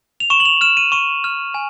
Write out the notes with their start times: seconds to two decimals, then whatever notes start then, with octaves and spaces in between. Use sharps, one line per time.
0.20 F7
0.30 C#6 E7
0.40 F#7
0.45 F7
0.61 F6 E7
0.77 D#7
0.92 C#6 D#7
1.24 F6
1.54 G#5